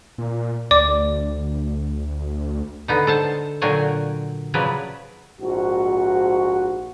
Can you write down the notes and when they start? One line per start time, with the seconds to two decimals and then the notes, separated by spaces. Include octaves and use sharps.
0.18 A#2
0.71 D2 D5 D6
2.88 D3 B3 D#4
3.07 A4 C5 A5
3.61 A#2 D3 F#3 F#4 G5 G#5
4.54 C#3 F3 F#3 B4 D5
5.41 A#1 G#2 F#4